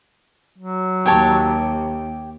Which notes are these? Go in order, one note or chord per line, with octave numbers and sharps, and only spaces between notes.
F#3
D#2 G4 C#5 A5